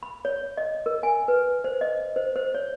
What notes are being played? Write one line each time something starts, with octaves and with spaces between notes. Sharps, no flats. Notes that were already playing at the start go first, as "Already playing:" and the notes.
B5
C#5
D#5
A#4
G#5
B4
C5
D#5
C5
C5
C#5